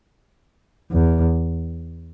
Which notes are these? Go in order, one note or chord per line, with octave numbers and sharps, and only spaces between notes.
E2